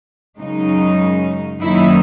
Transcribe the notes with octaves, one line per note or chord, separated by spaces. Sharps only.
F#2 C#3 G#3 D#4
F#2 D#3 F#3 A#3 D#4 E4